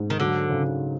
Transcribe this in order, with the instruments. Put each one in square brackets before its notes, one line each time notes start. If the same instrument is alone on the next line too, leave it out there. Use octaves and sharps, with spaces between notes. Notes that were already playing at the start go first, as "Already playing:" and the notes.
Already playing: [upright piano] G#2
[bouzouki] D#3
[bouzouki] D3 [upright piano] F#3
[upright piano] C#3